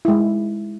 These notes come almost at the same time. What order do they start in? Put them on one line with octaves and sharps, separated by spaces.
E4 G#3 G#4